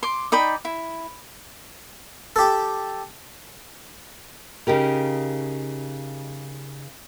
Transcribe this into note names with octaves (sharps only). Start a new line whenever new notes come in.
C6 D6
D#4 D5 G5 B5
E4
G4 A4
C#3 D#4 G4 A#4